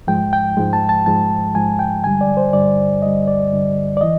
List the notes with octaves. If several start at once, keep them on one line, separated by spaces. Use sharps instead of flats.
G#2 F3 G#3 G5
G5
G#2 F3 G#3
A5
A5
G#2 F3 G#3 A5
G#2 F3 G#3 G#5
G5
G2 D3 G3 G#5
D5
C5
G2 D3 G3 D5
G2 D3 G3 D#5
D5
G2 D3 G3
D5
E3 D#5